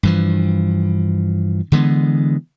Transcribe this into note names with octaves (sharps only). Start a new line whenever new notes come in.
G2 E3 F3
D3 E3 G#3 B3